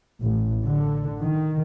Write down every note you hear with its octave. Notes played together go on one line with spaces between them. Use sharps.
A1
D3
D#3